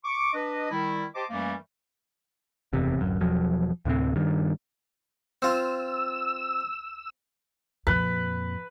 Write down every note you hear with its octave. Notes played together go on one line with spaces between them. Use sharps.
C#6 D6
D4 B4 D#5
D#3 G3 E4
G4 C5 D#5 A5 C6 D6
F#2 E3 G3 A3 A#3
F#1 E2 C3
D1 F#2
E1 E2 F3 F#3
D2 A2 C3 C4
G2 D#3
C4 F4 E6
F2 A#2 B4